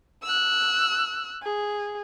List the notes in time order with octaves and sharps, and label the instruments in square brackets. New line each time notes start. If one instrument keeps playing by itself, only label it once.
[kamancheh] E6 F#6
G#4